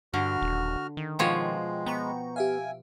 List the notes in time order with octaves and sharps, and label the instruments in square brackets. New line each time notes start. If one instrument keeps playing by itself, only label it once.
[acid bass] G2 [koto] D3 [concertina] F#4 F6
[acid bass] D#1
D#3
[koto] B2 F3 C#5 [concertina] G#3 [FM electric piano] F4 G5
[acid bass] B3 [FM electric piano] G5 A#5 C#6
[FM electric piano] G4 E5 F5 [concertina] G#5